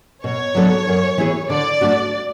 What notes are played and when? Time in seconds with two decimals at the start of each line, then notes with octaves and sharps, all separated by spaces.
0.24 B2 C#5
0.55 F#3 B3 D4 A4
0.87 F#2
1.17 E3 B3 E4 G#4
1.50 D3 D5
1.81 A3 D4 F#4